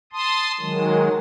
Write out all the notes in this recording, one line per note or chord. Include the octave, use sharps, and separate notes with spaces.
A5 C6 D#6
D#3 F#3 G#3